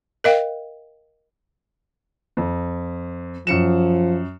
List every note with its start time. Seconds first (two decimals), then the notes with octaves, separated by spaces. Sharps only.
0.24 A#4 D#5 F5 G5
2.37 F2
3.47 F#2 F3 C#7 E7